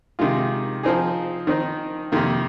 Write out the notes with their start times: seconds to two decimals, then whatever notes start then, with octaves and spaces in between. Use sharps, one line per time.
0.19 C3 D#3 G#3 F4
0.83 F3 C4 D#4 G#4
1.47 D#3 C4 D#4
2.12 F2 C3 D#3 A#3